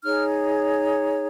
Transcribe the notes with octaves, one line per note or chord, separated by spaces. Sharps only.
D#4 G#4 C#5 F6